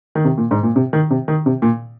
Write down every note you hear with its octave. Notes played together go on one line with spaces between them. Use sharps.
D#3
C3
A#2
G#2
A#2
C3
D#3
C3
D#3
C3
A#2